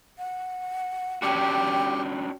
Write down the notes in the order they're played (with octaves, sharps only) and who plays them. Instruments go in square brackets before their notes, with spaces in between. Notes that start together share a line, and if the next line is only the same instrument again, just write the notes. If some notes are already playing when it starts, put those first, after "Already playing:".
[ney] F#5
[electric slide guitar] C#4 D4 F#4 [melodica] G4 [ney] G5